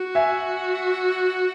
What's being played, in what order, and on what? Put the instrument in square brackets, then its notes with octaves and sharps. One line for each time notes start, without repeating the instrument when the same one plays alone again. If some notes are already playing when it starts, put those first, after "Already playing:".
Already playing: [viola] F#4
[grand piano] E5 G#5